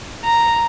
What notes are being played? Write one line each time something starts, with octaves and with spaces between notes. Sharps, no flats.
A#5